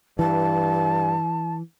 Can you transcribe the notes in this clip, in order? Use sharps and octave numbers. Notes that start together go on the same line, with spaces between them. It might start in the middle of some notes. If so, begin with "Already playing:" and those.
G2 E3 A5